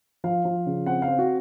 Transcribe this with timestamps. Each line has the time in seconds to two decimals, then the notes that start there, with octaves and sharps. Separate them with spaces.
0.24 F3 F5
0.45 F3
0.66 C#3
0.86 C4 F#5
1.02 F5
1.08 C4
1.19 F#4